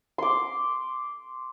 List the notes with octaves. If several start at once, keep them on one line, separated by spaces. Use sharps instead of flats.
C6 D6